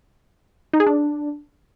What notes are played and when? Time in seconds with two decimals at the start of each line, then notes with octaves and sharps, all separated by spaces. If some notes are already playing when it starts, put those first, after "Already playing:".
0.73 D#4
0.80 G#4
0.87 D4